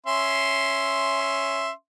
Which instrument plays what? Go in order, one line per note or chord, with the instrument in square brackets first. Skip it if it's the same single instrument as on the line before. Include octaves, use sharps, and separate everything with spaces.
[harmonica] C#4 E5 C6